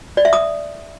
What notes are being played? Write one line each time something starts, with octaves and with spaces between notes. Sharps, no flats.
D5
E5
D#6